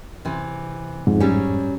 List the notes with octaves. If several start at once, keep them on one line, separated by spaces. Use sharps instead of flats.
C3 E3
F2 G#2
F#3 G3 C#4